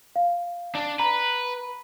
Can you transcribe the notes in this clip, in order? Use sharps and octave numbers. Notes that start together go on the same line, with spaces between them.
F5
D4
B4 A#5